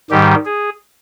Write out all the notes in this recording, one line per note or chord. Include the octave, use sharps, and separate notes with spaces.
G#2 D#3 G3 G4
G#4